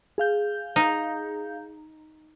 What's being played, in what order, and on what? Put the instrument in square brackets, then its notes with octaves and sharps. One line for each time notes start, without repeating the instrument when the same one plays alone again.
[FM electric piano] G#4 F5 G6
[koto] D#4